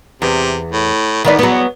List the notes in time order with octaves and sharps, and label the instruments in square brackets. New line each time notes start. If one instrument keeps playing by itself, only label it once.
[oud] E2 [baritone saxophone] C3
[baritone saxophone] A2
[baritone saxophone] E2 [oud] D#3 B3 D5
[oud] F#3 B3